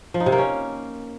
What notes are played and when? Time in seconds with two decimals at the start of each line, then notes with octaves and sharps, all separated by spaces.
0.14 F3
0.20 D#4
0.26 C3
0.32 A#3
0.38 C#4